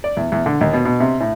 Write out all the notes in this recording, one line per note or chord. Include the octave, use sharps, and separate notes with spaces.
D5
E2
E2
D3
D#2
B2
B2
C3
A2